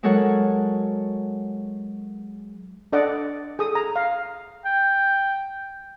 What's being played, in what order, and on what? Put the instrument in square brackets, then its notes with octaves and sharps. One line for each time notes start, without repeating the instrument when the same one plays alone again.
[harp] F#3 G#3 A4 A#4 C#5 F#5
[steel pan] D4 A4 D5 D#5 F#5 D6
G#4 A4 D#6
A#5
F5
[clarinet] G5